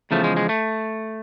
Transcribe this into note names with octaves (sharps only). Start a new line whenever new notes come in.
E2 C#3 F3 A3
G#3
G#3
A3